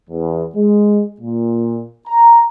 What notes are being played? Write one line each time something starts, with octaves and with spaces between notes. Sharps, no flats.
E2
G#3
A#2
A#5